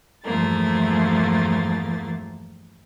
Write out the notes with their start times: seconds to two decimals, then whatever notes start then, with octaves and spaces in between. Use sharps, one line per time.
0.24 E2 G2 F3 A3 A#3 A6